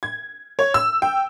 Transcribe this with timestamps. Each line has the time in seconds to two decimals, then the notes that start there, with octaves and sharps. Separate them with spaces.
0.03 G#6
0.59 C#5
0.74 E6
1.02 G5